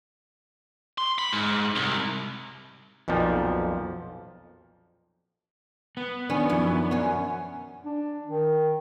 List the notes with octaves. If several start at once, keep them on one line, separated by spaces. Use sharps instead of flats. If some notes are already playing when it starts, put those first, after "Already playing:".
C6
B5
G#2
C2
B1 F2 A#2 F3
B3
D#3 F#3 C#4 D4
F#2 F3 E5
F#2 C#4 F#5
D4
D#3